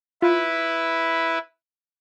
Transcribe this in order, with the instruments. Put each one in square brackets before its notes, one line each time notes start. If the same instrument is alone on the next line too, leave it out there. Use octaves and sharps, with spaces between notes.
[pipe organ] E4 B4 [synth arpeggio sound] F4